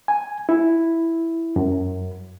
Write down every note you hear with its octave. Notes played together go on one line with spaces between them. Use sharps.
G#5
E4
F#2